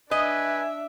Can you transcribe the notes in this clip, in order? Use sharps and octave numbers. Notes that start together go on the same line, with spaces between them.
D4 B4 D#5 E5 G#5